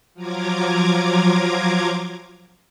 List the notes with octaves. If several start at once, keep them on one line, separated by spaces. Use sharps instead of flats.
F3 F#3 F4 A#5 D6 G#6